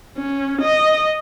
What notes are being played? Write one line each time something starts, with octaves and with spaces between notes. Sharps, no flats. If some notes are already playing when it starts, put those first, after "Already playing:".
C#4
D#5